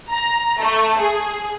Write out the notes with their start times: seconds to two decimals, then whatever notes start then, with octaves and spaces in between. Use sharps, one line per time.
0.12 A#5
0.61 A3
1.00 G#4